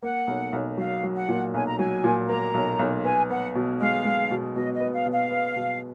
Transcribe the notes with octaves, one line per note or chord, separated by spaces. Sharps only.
A#3 F#5
B1
B1
F#3 F5
F#3
F#5
A#2
B1 G#5
A#5
F#3 G#5
A#2
A#3 A#5
B1
B1
B3 G#5
B3 F#5
B2
G#3 F5
G#3
B2
B2 D#5
D#5
B3
F5
B2
F5
B3
B2